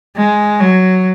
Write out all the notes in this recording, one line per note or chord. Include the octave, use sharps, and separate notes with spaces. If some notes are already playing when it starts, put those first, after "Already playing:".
G#3
F#3